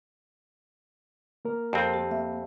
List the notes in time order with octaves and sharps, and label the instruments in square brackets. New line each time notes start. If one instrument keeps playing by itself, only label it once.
[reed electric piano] A#3 A#4
[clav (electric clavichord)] F2 C4 [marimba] G4
[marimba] G4
[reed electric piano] A#3 [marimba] E5